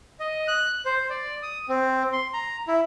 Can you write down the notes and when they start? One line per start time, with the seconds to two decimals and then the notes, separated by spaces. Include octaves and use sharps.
0.20 D#5
0.48 F#6
0.85 C5
1.10 D5
1.43 D#6
1.69 C4
2.13 C6
2.34 A#5
2.68 E4